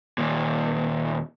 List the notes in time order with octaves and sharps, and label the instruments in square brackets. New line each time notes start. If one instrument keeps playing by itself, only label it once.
[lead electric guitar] D#2 A#2